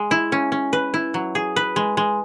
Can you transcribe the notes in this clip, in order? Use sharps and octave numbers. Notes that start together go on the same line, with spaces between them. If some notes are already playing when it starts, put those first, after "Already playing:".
Already playing: G#3
E4
C#4
C#4
B4
E4
F#3
G#4
B4
G#3
G#3